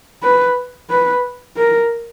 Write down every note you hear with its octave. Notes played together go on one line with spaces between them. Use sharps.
B4
B4
A#4